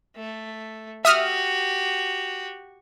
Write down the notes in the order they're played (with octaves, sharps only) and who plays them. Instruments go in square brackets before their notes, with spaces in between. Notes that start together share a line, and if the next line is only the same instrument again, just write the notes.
[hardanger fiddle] A3
[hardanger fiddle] F#4 G4 [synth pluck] E5 D#6 F6